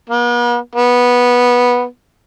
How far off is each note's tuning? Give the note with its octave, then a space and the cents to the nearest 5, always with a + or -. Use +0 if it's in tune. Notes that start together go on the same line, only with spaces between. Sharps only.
B3 -45
B3 -10